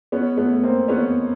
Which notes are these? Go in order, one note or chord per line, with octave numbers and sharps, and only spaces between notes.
B3 C#4
A3 B3
A#3 C4
B3 C#4